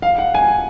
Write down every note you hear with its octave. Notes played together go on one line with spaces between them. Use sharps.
F5
F#5
G#5